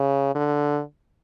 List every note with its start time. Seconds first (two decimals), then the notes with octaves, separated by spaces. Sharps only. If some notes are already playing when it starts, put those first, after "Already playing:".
Already playing: C#3
0.35 D3